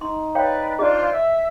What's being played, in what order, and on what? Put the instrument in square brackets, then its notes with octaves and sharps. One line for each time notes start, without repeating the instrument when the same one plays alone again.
[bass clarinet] D#4 [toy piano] C6
[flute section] B4 D5 [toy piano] C#5 F5 G5
[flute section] D4 F4 C5 [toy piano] G#4 D#5
[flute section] E5